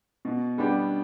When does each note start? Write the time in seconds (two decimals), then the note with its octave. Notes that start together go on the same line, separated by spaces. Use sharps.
0.25 B2
0.58 G3 B3 D4 G4